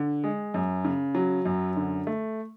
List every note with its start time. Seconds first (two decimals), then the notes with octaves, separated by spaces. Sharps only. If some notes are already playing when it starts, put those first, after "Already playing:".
Already playing: D3
0.24 G#3
0.54 F#2
0.85 C#3
1.15 F#3
1.45 F#2
1.76 D3
2.07 A3